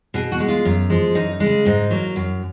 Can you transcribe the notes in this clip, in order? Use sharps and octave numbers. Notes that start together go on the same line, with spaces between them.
B2 G#4
F#4
G#3
F4
F#2
F3 G#3
F#2 D#4
C#3 G#3
G#2 D#4
F#3 A#3
F#2